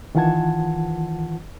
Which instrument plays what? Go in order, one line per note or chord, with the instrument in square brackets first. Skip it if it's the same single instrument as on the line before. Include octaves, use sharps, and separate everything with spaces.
[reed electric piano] D#3 E3 F4 F#5 A5 G#6